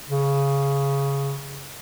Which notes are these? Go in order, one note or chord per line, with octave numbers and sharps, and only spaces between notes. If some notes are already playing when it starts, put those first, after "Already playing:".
C#3